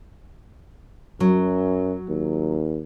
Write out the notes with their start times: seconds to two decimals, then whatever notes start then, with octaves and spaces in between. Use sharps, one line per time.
1.20 F#2 F#3
2.09 D#2